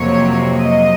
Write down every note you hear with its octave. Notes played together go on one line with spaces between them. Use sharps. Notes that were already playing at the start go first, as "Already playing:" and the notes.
Already playing: F2 C3 F#3 A#3 C#5
D#5